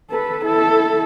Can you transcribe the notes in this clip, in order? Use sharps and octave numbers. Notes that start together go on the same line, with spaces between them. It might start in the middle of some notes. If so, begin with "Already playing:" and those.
A4 B4
E4 A4